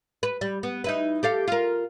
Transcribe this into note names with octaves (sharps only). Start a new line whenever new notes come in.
B4
G3
B3
D#4 E4 B4
G4 A4 F5
F4 A#4